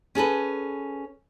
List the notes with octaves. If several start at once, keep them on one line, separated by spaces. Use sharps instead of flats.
C#4 G#4 A4 B4